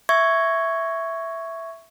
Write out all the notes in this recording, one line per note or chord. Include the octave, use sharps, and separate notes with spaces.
E5 C#6 G#6